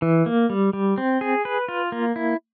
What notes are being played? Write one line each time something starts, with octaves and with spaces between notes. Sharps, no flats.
E3
A#3
G3
G3
C4
G#4
B4
F4
A#3
E4